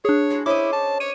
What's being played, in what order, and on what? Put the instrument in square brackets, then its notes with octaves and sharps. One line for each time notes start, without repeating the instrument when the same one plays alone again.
[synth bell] D4 G#4 [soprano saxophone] C#5
[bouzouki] G#3 E4 F#4
[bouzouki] C#4 C5 D#5 [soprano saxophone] E4 [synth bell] D6
[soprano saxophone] A5
[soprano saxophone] C#5 [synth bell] D#7